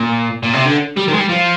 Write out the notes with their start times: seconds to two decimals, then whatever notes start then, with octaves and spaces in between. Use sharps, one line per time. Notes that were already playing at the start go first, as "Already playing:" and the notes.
Already playing: A#2
0.43 A#2
0.54 C3
0.65 D3
0.97 G3
1.08 D#3
1.14 G#3
1.18 G3
1.29 F3